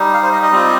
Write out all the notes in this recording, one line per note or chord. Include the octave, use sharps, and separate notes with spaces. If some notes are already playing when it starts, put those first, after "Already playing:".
Already playing: G3 D#4
F5
C5
D#5
D#5
G3 C4 F4